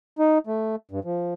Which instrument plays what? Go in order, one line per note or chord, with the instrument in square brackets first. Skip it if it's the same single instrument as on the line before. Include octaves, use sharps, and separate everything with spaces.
[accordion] D#4
A3
G2
F3